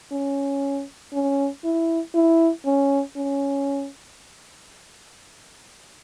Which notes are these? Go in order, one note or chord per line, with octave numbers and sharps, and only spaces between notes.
C#4
C#4
E4
E4
C#4
C#4